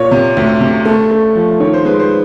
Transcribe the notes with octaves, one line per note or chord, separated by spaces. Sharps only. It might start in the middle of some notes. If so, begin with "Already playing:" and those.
Already playing: A#2 C#5
C3
D2
C3
A3
A3
F3
D#3 C#5
C5
G#3 B4
C5